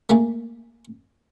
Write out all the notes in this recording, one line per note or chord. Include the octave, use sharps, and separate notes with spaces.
A3 A#3 G#4